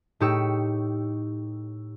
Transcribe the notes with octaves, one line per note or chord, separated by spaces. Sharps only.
A2 D#4 G4 C#6 E6